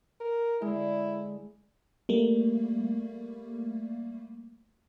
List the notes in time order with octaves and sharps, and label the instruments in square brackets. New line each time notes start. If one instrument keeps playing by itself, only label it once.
[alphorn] A#4
[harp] D3 G#3 [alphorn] E4
[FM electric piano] G3 A3 A#3